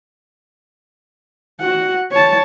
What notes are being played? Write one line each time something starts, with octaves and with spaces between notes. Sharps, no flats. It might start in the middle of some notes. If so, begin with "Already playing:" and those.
F#4 F#5
C#5 A5